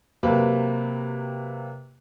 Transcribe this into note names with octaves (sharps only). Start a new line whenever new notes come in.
C3 F#3 A#3 G4 B4